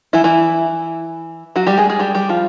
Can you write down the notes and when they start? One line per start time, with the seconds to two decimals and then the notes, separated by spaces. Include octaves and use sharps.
0.13 E3 E4
0.24 E3 E4
1.56 F#3 F#4
1.67 G3 G4
1.78 G#3 G#4
1.90 G#3 G#4
1.99 G3 G4
2.15 G3 G4
2.29 F3 F4